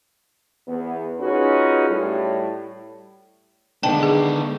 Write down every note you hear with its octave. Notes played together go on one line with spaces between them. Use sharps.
E2 B3
C#4 D#4 F4 F#4 G#4 B4
A2 G3
D3 D#3 G#3 B3 D4 G5 A5
G#4